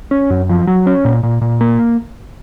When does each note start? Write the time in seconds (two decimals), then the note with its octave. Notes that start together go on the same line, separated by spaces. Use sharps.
0.11 C#4
0.30 F#2
0.49 F3
0.67 F#3
0.86 C#4
1.05 A#2
1.23 A#2
1.41 A#2
1.61 A#3